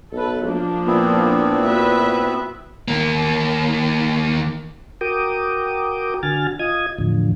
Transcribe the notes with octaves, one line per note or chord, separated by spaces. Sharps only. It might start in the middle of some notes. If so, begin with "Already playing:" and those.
B1 A4 B4
F3 A#3 D4
A#2 B3 C4 E4
F#4 B4 E5
D#2 A#3
F#4 A#4 G5 D6 D#6
D3 F#4 G#5 F6 A6
F4 D#5 D#6 G#6
E2 A2 D3 F3